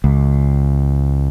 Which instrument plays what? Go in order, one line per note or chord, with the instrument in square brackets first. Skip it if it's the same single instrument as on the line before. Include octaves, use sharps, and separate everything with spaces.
[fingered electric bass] C#2